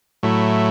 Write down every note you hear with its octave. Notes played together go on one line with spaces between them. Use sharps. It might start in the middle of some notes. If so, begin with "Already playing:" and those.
A2 F#3 A3 E4